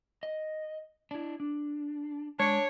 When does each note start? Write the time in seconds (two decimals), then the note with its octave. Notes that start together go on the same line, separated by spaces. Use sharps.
0.23 D#5
1.11 D4 E4
1.40 D4
2.40 G#3 D4 C#5